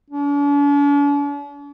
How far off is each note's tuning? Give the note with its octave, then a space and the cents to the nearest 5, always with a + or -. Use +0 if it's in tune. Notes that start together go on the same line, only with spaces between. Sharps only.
D4 -45